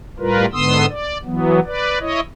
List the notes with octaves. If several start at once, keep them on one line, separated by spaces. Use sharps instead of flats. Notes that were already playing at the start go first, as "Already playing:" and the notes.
A2 G3 F4 A#4 B4
G#2 D3 B3 C6 D#6 E6
D5
E3 F#3 B3
B4 D5
E4 C#5 D#5